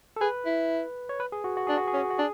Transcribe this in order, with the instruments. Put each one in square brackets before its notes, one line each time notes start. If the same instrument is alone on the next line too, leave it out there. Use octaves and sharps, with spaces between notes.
[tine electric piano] A4
[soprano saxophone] G#4 [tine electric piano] B4
[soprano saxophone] E4
[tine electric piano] C#5
B4
G#4
F#4
F#4
[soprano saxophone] D4 [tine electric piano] G#4
[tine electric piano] F#4
G#4
[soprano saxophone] C#4
[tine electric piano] F#4
F#4
[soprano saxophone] D4 [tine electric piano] G#4